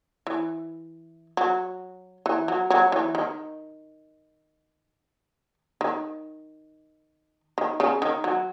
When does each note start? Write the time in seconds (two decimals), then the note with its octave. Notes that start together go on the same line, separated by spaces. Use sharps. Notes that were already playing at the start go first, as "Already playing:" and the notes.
0.27 E3
1.37 F#3
2.26 E3
2.48 F#3
2.70 F#3
2.92 E3
3.15 D#3
5.81 D#3
7.58 D#3
7.80 C#3
8.02 D#3
8.24 F#3